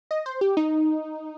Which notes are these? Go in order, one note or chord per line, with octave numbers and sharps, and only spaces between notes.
D#5
C5
G4
D#4